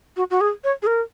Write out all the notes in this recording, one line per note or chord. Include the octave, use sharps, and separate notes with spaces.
F#4
F#4
G#4
C#5
G#4
A#4